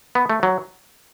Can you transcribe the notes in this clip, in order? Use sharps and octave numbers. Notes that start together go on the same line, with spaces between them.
B3
A3
F#3